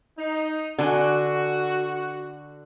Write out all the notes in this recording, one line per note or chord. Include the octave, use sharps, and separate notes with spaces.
D#4
D3 F#4 G#5